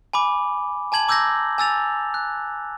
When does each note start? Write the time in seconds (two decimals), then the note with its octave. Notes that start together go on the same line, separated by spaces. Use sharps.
0.13 G#5 B5 D6
0.92 G#5 A5 G#6 F#7
1.08 A#5 D6 E6 G6 G#6 A#6
1.58 G#5 E6 A6 F7
2.14 F#6